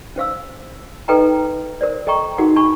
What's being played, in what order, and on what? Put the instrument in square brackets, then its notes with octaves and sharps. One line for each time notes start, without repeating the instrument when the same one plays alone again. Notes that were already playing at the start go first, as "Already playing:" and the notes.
[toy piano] C#4 C5 F5 E6
D#4 A4 B4 D#5 G5 A#5
A#4 C5 D5
A4 D#5 G5 A#5 C#6
D#4 F#4 G#4 A#4 F#5
D4 A5 B5 C#6